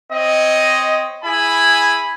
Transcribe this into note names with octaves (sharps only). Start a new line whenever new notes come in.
C4 C#5 D#5
E4 G#4 G#5 B5